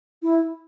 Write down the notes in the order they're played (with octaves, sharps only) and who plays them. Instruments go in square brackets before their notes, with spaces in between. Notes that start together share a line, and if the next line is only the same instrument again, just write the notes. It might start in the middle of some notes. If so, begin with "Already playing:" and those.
[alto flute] E4